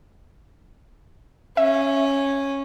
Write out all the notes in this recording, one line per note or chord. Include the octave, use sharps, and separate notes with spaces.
C#4 E5